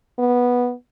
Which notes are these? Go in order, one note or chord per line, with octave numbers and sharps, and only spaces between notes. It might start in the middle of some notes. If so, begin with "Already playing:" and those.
B3